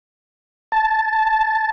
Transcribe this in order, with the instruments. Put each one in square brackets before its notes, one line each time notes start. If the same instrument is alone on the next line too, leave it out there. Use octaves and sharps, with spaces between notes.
[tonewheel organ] A5